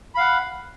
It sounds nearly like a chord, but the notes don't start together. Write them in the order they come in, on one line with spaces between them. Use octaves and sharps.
B5 F5 F#5